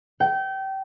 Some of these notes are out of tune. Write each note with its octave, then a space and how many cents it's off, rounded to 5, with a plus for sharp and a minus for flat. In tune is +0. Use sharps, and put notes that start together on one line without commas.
G5 -25